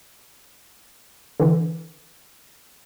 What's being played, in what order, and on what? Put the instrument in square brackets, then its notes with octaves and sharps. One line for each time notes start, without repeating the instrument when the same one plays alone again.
[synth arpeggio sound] D3 E3